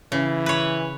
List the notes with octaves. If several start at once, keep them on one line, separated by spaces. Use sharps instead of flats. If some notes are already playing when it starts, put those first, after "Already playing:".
C#3 E3
B4 C#5